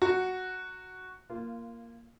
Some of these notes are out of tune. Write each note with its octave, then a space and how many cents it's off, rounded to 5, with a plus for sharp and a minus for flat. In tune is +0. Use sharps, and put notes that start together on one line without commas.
F#4 +0 A#5 -25
A#3 +0 F4 -20